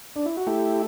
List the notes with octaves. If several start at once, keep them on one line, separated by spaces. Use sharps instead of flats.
D4
E4
F#4
A3 E4 G4